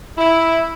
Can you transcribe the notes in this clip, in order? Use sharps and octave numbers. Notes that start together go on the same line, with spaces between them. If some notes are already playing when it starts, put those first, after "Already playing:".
E4